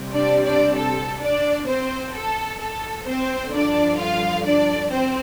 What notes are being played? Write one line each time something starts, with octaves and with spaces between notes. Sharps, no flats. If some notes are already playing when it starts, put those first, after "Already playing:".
Already playing: C3 G3 C4
D4 D5
D4 D5
A4
D4 D5
C4 C5
A4
A4
C4 C5
G2 D3 F3 D4 D5
F4 F5
D4 D5
C4 C5